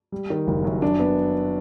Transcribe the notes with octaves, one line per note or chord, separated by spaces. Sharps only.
G3
D#3
F#1
F#2
D4
B3